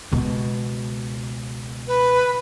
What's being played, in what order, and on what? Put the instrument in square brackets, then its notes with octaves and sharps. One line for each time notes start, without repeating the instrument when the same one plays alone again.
[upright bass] C#2 B2
[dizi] B4